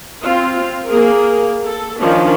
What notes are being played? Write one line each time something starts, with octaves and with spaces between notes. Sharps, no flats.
C4 F4
A#3 G#4 A#4
A4
D#3 F3 C#4 D4